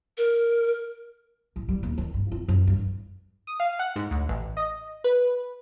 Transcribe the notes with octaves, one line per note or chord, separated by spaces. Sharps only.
A#4
A1
G3
D#2
D#3
G2
F4
F#2
G2
D#6
F5
F#5
G#2
D2
A1
D#5
B4